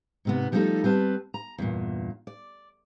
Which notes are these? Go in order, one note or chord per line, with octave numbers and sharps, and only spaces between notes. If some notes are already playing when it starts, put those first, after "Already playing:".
G#2 C3 B3
F3 G3 A3 B3 D#4 A4
G3 C4 B4 E5 A5
A#5
E2 G2 A#2
D5